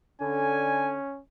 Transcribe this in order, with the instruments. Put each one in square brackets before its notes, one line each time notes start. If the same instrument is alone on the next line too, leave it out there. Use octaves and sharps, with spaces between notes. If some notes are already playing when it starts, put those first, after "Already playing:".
[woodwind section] D3 [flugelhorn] C#4 [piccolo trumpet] G#5